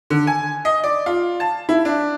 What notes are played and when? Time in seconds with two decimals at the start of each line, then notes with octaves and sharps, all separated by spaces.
0.10 D3
0.27 G#5
0.65 D#5
0.84 D5
1.06 F4
1.40 A5
1.69 E4
1.85 D4